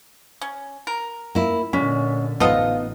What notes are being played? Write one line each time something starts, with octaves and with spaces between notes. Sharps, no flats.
C#4
A#4
A#3 E4
A#2 D3 G#3 C#4
A1 B3 D#4 F4 A4 C5 D#5